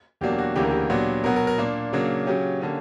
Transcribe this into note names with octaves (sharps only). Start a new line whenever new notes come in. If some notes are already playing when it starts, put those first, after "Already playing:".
E2 B2 F#3 A#3 D4 G4
F#4
D2 C#3 E3 A#3 D4 G4
A#4
G4
A#2 F#3 B3 D4
B2 F#3 B3 A#4
A#4
A#4
A#2 A#3 D4
C#3 F#3 A#3 D4
C#3 F#3 C#4 G4
D3 A#3 C#4